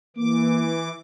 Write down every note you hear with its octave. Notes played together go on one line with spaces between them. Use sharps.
E3 A#3 D6